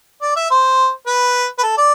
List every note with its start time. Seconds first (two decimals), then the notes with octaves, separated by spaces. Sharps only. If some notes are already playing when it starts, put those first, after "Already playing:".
0.22 D5
0.36 E5
0.51 C5
1.07 B4
1.58 B4
1.63 A4
1.77 D5